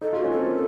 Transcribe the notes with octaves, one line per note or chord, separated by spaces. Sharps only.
D#4 A4
F4 F#4
C#4
C4 A4
A#3